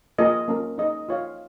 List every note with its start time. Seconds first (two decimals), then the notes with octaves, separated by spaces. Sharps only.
0.19 A#3 F4 G#4 D#5
0.48 A#3 C#4 F4 A#4
0.78 D#4 G#4 D#5
1.09 F4 C#5 F5